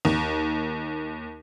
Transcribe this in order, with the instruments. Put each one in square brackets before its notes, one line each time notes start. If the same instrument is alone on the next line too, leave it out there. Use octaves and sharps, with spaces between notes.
[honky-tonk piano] D#2